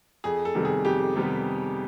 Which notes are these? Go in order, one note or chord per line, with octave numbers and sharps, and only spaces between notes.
F2 G#4
A4
C3 D#3 G3 B3
G#4
F2 G4
C3 D#3 G3 B3